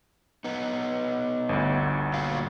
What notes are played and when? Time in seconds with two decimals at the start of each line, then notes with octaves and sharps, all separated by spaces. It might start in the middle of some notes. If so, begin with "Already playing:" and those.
0.44 B3 D#4
1.49 G1 D2
2.14 A#2 F#3 F5